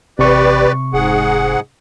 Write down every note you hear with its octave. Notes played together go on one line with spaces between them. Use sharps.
A1 C3 G4 B4 D5 C#6
F1 G#2 G#4 F#5